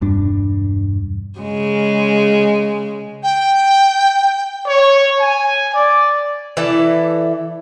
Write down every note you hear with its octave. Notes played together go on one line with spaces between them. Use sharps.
E1 G2 D4
C#3 G#3
G5
C#5
G#5
D5
E3 E4 A4 D5